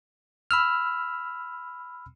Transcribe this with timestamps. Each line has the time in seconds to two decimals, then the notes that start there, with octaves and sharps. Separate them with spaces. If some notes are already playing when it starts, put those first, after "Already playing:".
0.51 B5 E6 F6